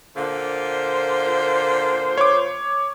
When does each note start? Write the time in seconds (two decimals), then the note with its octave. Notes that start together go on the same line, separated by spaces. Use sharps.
0.17 A#2 D3 F4 C5
2.18 C#5 D6